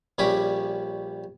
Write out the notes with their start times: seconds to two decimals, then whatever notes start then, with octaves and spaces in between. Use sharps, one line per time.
0.18 A#1 G3 C#4 B5 D6 D#6